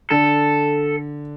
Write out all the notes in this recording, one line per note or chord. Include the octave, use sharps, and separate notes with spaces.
D3 A4